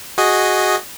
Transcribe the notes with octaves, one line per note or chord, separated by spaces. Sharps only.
F#4 G#4 D#5